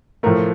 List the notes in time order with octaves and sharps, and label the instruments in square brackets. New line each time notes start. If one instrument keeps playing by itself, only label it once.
[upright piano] A2 F3 A3 A#4